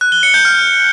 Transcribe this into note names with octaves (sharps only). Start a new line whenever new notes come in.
F#6
G7
C#7
G6
F6